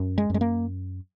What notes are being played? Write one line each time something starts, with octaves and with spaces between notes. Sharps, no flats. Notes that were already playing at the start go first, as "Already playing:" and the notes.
Already playing: F#2
G#3
F#2 G#3
A#3